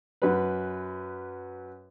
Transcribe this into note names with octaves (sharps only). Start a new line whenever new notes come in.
F#2 B4